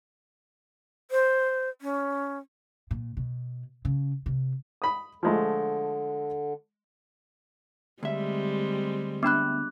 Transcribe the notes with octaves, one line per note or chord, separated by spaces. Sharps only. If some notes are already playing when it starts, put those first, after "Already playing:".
C5
C#4
A#2
B2
C#3
C3
B5 D#6
D3 F3 G#3 A3
D2 G3 G#3 C4 E5
B3 D4 B5 D6 F#6